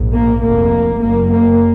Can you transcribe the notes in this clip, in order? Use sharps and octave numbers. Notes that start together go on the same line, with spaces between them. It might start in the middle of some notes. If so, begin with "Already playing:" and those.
Already playing: A#1 G#2
A#3
F1 F2 A#3
F#1 F#2 A#3
A#3